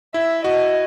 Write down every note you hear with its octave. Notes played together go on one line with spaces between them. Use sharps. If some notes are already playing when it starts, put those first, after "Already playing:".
E4 E5
F#4 D#5